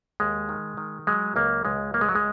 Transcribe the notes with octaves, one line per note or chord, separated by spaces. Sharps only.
D#2 G#3
D#3
D#3
F#3 G#3
C#2 A#3
C#2 G#3
F#3 A#3
G#3
F#3
G#3